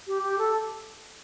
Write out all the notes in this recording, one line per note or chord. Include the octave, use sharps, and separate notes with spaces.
G4
G4
A4